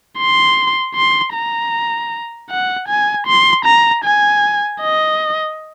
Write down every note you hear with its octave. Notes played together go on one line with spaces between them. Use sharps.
C6
C6
A#5
F#5
G#5
C6
A#5
G#5
D#5